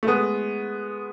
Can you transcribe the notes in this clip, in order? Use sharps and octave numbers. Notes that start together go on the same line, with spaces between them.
A3
G#3 B3